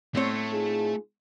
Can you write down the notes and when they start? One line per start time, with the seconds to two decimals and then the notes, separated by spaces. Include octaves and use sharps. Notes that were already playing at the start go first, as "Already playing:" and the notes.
0.15 A2 A3 C4 C#5
0.52 D#4 F4 G#4